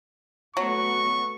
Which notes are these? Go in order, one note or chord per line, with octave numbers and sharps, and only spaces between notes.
F#3 A3 B3 F#4 C#6